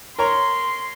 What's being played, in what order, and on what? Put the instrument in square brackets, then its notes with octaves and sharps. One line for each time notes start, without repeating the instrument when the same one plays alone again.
[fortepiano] A#4 C#5 A#5 [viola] C6